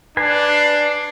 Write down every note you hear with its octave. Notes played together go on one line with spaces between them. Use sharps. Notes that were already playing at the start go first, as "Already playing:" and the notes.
D4 B4 G#5 C7